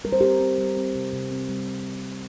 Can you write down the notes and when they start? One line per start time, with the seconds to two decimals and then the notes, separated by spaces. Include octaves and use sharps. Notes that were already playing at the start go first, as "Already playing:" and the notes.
0.04 G3 A#4
0.12 C5
0.21 C4 G4 A#4
0.40 C4
0.58 G3
0.77 C4
0.95 C3
1.13 C3
1.31 C4
1.49 G3